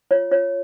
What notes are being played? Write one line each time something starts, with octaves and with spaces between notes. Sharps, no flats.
F4 C#5
F4 C#5